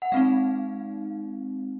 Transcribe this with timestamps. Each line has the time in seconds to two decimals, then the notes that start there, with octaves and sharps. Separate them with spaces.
0.02 F#5
0.12 G#3 C4 D#4 F5